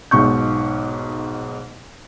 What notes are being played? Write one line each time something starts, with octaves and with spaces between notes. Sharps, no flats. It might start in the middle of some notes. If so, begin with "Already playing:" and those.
B1 G#2 B2 C#6 G6